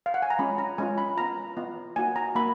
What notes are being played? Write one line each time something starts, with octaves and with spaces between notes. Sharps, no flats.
F5
F#5
G#5
A#5
G#3 C#4 F4 B5
A#5
G#3 C#4 F4 G#5
B5
B3 F4 A#5
B3 F4
A#3 D#4 F#4 G#5
A#5
A#3 D#4 F#4 B5